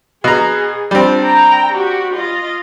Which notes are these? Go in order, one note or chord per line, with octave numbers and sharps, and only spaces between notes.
B2 G#4 A#5
G3 C4 D4 F4
G5 A#5
F#4 G4
F4 D#5